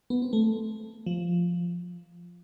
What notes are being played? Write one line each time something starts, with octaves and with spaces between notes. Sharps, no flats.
B3
C4
A3
F3